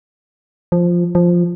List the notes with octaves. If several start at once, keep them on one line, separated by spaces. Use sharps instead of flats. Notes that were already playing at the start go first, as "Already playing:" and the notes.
F3
F3